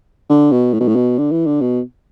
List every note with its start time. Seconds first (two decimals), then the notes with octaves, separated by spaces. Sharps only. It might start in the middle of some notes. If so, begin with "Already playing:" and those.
0.29 D3
0.52 B2
0.74 A2
0.80 B2
0.88 A2
0.96 B2
1.18 D3
1.31 E3
1.46 D3
1.61 B2